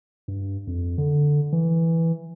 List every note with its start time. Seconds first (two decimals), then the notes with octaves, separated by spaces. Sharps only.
0.28 G2
0.67 F2
0.98 D3
1.53 E3